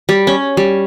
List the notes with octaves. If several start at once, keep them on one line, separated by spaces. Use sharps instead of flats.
G3
C#4
G3